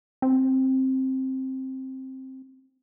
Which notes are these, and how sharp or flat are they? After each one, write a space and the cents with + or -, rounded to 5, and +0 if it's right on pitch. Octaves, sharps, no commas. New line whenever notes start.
C4 +10